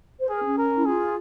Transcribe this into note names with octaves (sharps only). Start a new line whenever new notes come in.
C5
G#4 A#4
C#4
A#4
E4
F4 G#4